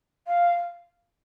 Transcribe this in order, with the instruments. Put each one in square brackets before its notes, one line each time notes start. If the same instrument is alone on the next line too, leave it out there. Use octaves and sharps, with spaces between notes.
[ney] F5